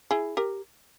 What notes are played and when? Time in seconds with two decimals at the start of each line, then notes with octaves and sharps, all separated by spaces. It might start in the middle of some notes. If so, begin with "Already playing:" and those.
0.11 E4 G#4
0.37 G4 A#4